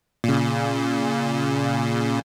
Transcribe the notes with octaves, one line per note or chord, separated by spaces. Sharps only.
A#2 C#3